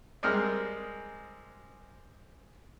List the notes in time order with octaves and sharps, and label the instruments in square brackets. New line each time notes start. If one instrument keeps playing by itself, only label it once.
[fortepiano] G3 G#3 C4 A#4 F6